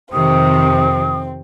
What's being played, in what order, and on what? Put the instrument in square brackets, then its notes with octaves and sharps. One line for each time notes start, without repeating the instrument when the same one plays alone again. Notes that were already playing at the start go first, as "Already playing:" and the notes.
[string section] F2 C3 [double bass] D#3 [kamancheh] C4 [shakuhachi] D#6